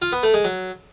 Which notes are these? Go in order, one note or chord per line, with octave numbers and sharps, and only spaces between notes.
F4
B3
A3
G#3
F#3